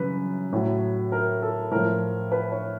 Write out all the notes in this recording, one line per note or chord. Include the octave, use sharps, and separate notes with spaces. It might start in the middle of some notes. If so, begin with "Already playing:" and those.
Already playing: F#2 C#3 E3 G3 B4
A2 F#3
A#4
A4
A2 F3 A#4
B4
C#5